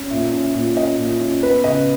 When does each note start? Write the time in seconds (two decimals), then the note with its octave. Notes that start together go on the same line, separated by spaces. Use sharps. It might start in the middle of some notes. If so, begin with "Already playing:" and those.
Already playing: C#4
0.10 A#2 E5
0.33 C#4
0.54 A#2
0.76 C#4 D#5
0.98 A#2
1.20 C#4
1.42 B3 B4
1.64 C#3 D#5